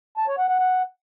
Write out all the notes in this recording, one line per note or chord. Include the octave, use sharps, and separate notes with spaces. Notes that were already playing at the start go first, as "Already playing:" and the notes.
A5
C#5
F#5
F#5
F#5